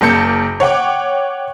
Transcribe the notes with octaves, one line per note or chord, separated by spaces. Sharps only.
F#1 A#3 A5 G6 C#7
C#5 F#5 G5 D6